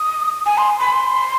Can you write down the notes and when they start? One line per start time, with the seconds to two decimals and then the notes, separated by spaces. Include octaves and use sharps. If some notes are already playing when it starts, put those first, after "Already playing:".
Already playing: D#6
0.46 G#5
0.58 C6
0.80 B5
0.92 C6